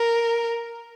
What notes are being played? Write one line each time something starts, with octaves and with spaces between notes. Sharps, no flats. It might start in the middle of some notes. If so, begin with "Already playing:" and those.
Already playing: A#4